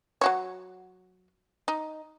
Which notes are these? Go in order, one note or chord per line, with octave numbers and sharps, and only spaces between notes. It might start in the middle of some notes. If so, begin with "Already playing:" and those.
F#3 F#4 C#5
D#4